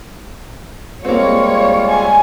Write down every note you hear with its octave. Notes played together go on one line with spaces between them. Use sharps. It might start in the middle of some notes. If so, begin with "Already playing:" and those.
G3 G#3 A#3 C4 F4 C#5
G#5